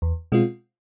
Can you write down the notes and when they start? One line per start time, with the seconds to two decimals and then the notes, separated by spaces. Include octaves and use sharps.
0.02 E2
0.32 B2 G#3 C4 F4